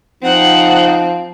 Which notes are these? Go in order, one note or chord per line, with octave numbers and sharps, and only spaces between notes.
F3 C4 D#4 F#5